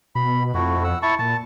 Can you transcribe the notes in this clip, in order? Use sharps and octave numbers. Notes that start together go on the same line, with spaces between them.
B2 B5
F2 A3 E4 F#4
F#5 E6
E4 A5 C#6
A#2 A5